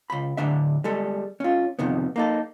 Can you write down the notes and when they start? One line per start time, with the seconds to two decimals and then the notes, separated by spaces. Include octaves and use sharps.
0.10 C#2 B5
0.37 A2 D3 D4 E5
0.84 G3 G#3 A4
1.40 C#4 F4
1.79 F2 C3 D#3 B3
2.16 A#3 D#4 A4